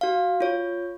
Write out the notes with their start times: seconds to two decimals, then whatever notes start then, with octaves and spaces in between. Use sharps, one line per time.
0.01 F#4 F5
0.41 F4 C#5